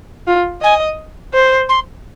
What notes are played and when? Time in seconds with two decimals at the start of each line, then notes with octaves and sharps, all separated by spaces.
0.27 F4
0.62 D#5 G#5
1.34 C5
1.69 C6